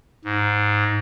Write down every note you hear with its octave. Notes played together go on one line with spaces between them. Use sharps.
G#2